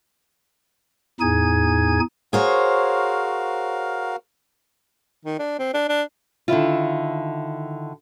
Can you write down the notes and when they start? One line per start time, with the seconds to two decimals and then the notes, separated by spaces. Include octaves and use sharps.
1.20 E2 A2 D#4 G#4 G#5 G#6
2.33 F#4 G#4 A#4 C5 C#5 F5
5.25 D#3
5.39 D4
5.59 C4
5.74 D4
5.89 D4
6.48 D3 D#3 E4 F4